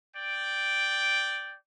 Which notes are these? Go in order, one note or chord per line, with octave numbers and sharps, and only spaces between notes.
D5 G5